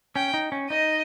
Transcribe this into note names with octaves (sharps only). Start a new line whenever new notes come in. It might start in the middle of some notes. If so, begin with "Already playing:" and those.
C#4 G5
D#4
C#4
D#4 D#5